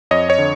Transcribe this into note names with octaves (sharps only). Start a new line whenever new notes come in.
F2 C#5 D#5
C#5 D#5
D3